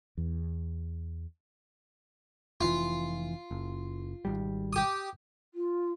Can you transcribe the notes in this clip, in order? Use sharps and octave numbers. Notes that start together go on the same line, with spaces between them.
E2
F1 E3 F4
F#1
G#1 G3
G4 D#6
F4